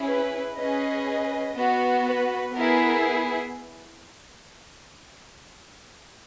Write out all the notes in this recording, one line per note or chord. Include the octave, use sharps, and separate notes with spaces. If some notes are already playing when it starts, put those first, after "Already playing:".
Already playing: C#4 E4 G#4
B4
C#4 G#4 B4 D#5
B3 F#4
B4
B3 E4 G#4 A#4